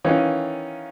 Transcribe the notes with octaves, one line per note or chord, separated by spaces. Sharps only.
D#3 E3 C#4 D#4 F4